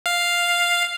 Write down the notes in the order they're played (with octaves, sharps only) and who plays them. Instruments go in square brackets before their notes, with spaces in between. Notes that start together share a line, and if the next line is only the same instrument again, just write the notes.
[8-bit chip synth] F5